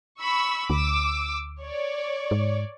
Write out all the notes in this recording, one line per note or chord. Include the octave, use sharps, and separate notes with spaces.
B5 C#6 E6
D2 D6 E6
C#5 D5
G#2